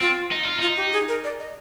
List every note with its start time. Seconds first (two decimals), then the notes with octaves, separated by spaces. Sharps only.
0.01 C4 F4
0.31 D#4
0.44 F4
0.58 D#4 F4
0.77 G4
0.93 G#4
1.08 A#4
1.24 D5
1.39 D#5